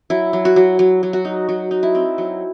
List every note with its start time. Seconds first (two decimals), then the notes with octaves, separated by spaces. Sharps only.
0.10 F#3 E4
0.33 F#3
0.45 F#4
0.56 F#3
0.79 F#3
1.03 F#3
1.13 F#4
1.25 D#4
1.49 F#3 F#4
1.71 D#4
1.83 E4
1.95 C4
2.18 F#3